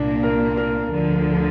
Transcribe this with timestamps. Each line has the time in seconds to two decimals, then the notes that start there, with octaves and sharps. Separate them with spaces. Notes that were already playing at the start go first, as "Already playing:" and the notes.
Already playing: C2 A#2 A#3 D4
0.23 A#4
0.57 A#4
0.92 D2 D3 F3